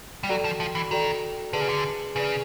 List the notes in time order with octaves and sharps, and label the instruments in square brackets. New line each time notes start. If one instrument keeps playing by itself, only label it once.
[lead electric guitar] G3
[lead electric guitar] F#3 [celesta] F#4 A4 D5 G5
[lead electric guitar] F3
F3
E3
[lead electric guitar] D#3 [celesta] F#4 A4 D5 G5
[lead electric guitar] D3 [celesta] G#4 B4 D5
[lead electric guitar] C#3
D3
[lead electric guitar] C#3 [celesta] G#4 B4 D5